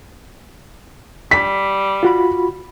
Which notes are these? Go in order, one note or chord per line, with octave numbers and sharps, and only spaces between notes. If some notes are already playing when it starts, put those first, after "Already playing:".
G3 B6
F4 F#4 B5